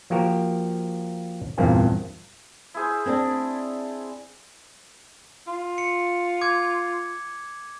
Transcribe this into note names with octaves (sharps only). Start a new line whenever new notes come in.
F3 A#3 F#4 G4 A#4
E2 G2 A#2 A#3 C4
E4 G#4 C5
C4 D4
F4
C#7
D6 G#6